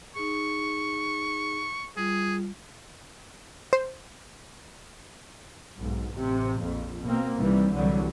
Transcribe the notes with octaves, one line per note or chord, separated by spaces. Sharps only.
D#4 G#4 C#6
G3 F4 G#4
C5
B1 G#2
A1 C3
A#1 F2
B2 A#3 C4
C2 C3 D#3 E3 G3
C2 D3 E3 F#3 G3